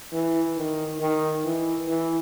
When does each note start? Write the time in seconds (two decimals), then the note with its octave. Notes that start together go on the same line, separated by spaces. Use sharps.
0.12 E3
0.56 D#3
1.00 D#3
1.44 E3
1.88 E3